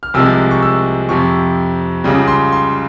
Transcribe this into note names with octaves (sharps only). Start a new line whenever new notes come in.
F6
C2 C3 F3 G#3 E6
C#6
E6
F2 C3 F3 C#6
C#2 C#3 G3
C6
C6